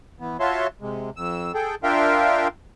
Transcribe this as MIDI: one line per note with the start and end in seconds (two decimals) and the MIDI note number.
0.20 0.37 52
0.20 0.37 59
0.40 0.67 65
0.40 0.67 66
0.40 0.67 73
0.40 0.67 76
0.40 0.67 81
0.40 0.67 84
0.81 1.10 48
0.81 1.10 56
1.17 1.52 41
1.17 1.52 88
1.54 1.75 68
1.54 1.75 69
1.54 1.75 79
1.83 2.48 62
1.83 2.48 65
1.83 2.48 70
1.83 2.48 76
1.83 2.48 77
1.83 2.48 79